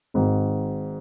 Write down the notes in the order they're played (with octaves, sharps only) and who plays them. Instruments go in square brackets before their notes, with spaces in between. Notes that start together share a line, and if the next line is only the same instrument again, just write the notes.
[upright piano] G#1 G#2 D#3